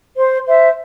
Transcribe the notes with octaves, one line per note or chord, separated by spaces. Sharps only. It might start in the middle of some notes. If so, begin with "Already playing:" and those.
C5
C5 E5